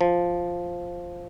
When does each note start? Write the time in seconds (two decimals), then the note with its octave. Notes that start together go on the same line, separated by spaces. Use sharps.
0.01 F3